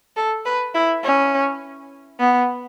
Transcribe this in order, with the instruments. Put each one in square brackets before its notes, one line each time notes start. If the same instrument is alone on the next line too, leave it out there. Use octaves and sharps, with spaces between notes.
[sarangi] A4
B4
E4
C#4
B3